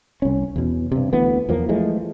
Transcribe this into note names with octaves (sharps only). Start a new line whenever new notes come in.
C2 C#4
E2 B2
G2 C3
D2 E3 A3 B3
E2 F3 A#3
E3 F3 G#3 A3